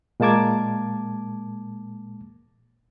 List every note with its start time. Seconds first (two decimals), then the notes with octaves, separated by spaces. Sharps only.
0.20 A#2 G#3 A#3 A5 D6 G#6